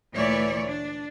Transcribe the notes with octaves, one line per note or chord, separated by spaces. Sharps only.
D2 A#2 E3 A3 C#5 D5
D4